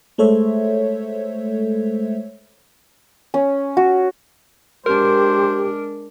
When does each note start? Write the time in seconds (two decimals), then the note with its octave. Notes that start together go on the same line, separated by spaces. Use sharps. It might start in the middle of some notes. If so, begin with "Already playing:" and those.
0.18 G#3 A3 A4 C5 C#5 E5
3.34 C#4
3.77 F#4
4.86 G#3 D4 G4 A#4 C5